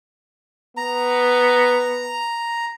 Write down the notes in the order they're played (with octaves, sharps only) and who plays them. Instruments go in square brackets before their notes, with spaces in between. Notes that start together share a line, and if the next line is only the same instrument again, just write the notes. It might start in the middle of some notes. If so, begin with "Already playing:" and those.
[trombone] B3 [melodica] A#5